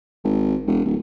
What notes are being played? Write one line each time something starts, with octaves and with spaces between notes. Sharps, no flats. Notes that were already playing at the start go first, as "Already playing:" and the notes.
G#1
E1
D1